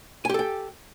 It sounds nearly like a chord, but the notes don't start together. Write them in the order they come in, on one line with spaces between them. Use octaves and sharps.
G#5 G4 A4 G5